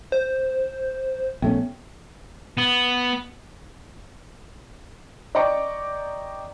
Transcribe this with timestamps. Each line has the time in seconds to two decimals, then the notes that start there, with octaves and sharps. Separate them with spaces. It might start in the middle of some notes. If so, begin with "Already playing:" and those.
0.12 C5
1.42 A#1 A3 B3 C#4
2.58 B3
5.35 D5 D#5 G5 A#5 C#6 D6